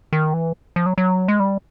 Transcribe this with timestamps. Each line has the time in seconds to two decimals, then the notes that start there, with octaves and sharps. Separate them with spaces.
0.13 D#3
0.33 E3
0.76 F3
0.86 F#3
0.98 F#3
1.28 G#3
1.40 G3